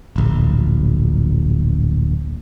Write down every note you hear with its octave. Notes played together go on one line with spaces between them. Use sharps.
D1 A#1